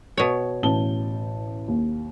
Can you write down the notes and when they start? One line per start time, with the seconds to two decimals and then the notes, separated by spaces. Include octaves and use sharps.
0.17 B2 C#5
0.63 A1 A5 G7
1.68 D#2